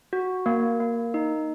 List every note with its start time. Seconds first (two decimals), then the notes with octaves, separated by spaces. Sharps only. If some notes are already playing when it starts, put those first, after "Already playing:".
0.13 F#4
0.46 A#3
0.80 A#3
1.14 D#4